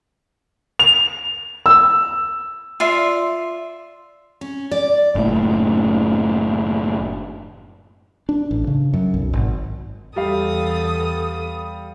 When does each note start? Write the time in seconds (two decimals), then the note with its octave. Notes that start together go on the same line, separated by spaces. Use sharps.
0.79 F7
1.66 E6
2.80 F4 D5 E5 C6
4.41 C#4
4.71 D5
5.15 F#1 A2
8.29 D4
8.51 A1
8.67 C#3
8.93 F#2
9.14 B1
9.33 G#1
10.16 E2 G3 A4 F5 D#6